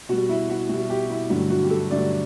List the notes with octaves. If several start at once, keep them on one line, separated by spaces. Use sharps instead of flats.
B2 G3 F#4
E4
F#4
B2 G3 F#4
G4
E4
G2 D3 F#3 A3 F#4
F#4
G4
A4
G2 D3 F#3 A3 D5